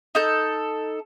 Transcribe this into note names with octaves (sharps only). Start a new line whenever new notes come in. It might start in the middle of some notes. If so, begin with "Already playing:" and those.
D#4 A4 G6